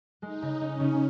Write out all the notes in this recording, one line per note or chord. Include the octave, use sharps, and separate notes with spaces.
G#3 D#4
C#3
C#4 D#4
C#3